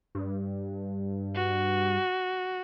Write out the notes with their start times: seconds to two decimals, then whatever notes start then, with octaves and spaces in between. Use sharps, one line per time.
0.15 G2
1.35 F#4